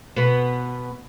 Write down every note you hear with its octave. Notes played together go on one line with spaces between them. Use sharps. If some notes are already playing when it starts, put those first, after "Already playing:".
B2 B3